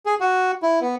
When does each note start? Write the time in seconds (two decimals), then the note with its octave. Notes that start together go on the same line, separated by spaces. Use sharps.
0.06 G#4
0.20 F#4
0.62 E4
0.81 B3